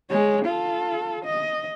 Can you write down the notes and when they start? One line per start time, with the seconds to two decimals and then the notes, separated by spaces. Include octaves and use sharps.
0.10 G#3 C#5
0.45 F4 A4
1.25 D#5